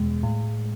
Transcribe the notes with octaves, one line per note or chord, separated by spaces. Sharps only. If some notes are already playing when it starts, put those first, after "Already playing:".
Already playing: E2 B2 G#3
A2